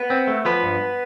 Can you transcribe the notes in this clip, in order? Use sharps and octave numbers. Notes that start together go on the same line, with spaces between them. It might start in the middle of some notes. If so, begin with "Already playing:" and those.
Already playing: B3 B4
C4
A3
F3 B3 B4
G2